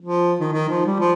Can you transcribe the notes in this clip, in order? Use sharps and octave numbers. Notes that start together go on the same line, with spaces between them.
F3
D#3
D#3
F3
G3
F3